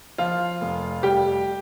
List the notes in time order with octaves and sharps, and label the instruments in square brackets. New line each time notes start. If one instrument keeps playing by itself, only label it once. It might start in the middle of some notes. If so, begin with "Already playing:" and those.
[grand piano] F3 F4 F5
F1
G3 G4 G5